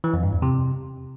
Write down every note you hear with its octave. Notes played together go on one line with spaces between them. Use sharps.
E3
F2
G2
E2
C3